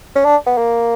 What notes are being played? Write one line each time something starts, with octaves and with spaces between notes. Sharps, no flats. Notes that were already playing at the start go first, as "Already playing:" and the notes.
C#4
D4
B3
A#3